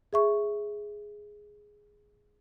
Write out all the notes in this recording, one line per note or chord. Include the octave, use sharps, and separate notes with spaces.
G#4 E5 C#6